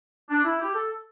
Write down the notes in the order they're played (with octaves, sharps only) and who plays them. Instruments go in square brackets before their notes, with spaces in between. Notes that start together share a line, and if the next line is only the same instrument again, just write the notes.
[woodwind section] D4
E4
G4
A4